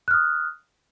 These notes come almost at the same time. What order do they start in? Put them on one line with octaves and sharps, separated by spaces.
F#6 F6 D#6